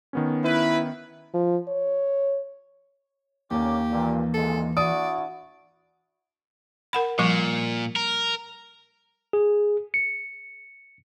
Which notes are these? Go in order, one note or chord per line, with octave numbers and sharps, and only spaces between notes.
D#3 B3 C#4
E4 B4
F3
C#5
D#2 D3 A#3 C#4 G4 D6
G2 A#2 E3
C2 A#2 G#3 A4
D4 E4 F#4 D5 D#6
A#4 F#5 B5
A#2 F3 G3 C#6
A#4
G#4
C#7